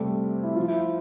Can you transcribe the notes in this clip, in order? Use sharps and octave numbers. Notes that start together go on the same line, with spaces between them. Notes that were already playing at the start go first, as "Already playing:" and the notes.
Already playing: C3 G3 A3
E4
F3 F4
E4